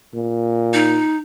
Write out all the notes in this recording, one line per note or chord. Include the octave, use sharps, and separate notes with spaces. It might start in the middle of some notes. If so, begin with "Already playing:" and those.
A#2
D#4